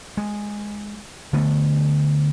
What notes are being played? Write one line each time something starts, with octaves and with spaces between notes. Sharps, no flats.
G#3
D3 A3 B3